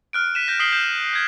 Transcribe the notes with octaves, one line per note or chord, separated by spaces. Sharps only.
F6 F#6 D7
B6 D#7 E7
G6 A#6
D#6 B6 C7 D7 F#7 G7
G6 E7
G6 G#6 C7